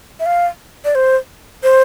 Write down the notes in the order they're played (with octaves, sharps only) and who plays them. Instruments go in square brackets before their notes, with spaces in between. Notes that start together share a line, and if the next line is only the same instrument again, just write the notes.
[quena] E5
F5
D5
C5
C5